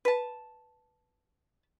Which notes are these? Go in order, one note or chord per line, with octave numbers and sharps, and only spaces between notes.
B4 A5